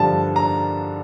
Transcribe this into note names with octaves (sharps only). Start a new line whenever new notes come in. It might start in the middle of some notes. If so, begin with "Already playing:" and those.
Already playing: G2 D3 F3 A5
A#5